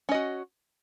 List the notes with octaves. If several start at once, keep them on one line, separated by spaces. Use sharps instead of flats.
C#4 F#4 D#5